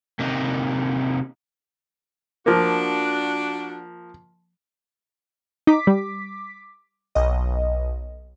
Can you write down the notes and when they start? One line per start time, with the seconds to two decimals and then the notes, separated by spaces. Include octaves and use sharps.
0.19 C3 A#3 D#4
2.46 F3 A#3 D4 F#4
5.67 D#4 D6 B6
5.87 G3
7.15 B1 D#5